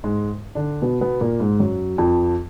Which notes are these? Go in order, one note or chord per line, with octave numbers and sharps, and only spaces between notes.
G#2 G#3
D3 D4
B2 B3
B2 B3
A#2 A#3
G#2 G#3
F#2 F#3
F2 F3